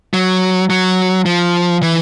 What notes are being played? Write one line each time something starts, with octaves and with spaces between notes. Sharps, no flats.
F#3
F#3
F3
E3